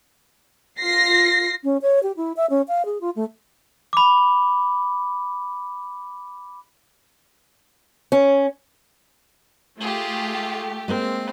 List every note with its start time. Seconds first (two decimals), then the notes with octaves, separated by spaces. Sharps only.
0.79 F4 A#6 C7
1.64 C#4
1.82 C#5
2.03 G4
2.17 E4
2.37 E5
2.50 C#4
2.68 F5
2.85 G#4
3.01 F4
3.16 A3
3.93 B5 D6
8.12 C#4
9.81 A3 F4 G4 G#4
10.88 G#3 A#3 C4 A#4